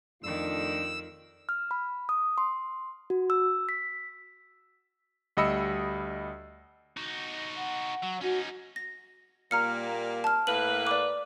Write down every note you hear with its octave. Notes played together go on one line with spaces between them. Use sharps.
F2 D#3 A3 D4 F4 E6
F6
B5
D#6
C6
F#4
E6
B6
D2 G3 D#5 B5 E6 C#7
D#4 F#4
F#5
F#3
C#4 D#4 F#4
A#6
A#2 G3 A#3 A#5 F6 C#7
A5 F6
A2 A#3 B4 F#7
D5 D6